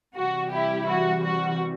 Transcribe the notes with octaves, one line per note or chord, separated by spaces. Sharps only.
C3 E3 G3 F#4
E4 G4
F#4
F#4